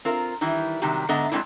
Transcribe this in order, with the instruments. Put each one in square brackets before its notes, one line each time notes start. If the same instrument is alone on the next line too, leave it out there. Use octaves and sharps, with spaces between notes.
[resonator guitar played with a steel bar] C4 F4 A#4
D#3 E3 G3 E4
C3 D#3 F#3 G3 G4
G#2 D3 B3 D#5 E5 A#5
F#3 G#3 A#3 C4 D4 E4